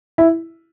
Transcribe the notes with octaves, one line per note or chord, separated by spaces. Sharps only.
E4